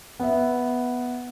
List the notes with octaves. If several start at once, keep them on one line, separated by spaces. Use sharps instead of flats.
B3 E5